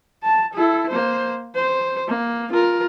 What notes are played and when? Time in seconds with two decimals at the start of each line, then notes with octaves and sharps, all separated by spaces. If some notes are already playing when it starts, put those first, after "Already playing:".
0.24 A5
0.53 E4 A4
0.89 A#3 C5
1.55 C5
2.08 A#3
2.52 F4 A#4